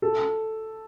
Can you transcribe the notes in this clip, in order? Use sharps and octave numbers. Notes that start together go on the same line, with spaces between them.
A4